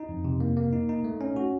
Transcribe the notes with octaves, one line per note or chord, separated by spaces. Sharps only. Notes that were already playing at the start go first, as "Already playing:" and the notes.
Already playing: D#4
F2
C3
A#3
A#3
D#4
D#4
A3
C#4
F#4